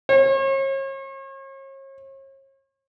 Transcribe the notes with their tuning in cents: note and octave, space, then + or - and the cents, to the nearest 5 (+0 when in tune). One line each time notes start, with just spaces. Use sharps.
C#5 -40